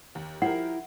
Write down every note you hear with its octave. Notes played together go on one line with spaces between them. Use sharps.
D#2
F3 E4 G4 A#4 F#5